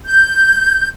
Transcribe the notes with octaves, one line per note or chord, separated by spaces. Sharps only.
G6